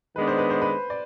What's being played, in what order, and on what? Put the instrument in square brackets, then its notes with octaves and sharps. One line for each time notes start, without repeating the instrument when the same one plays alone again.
[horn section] D#3 G#3 B3 D4 [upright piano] B4
[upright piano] C5
B4
C5
B4
D5